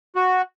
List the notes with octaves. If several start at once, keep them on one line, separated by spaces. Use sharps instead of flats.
F#4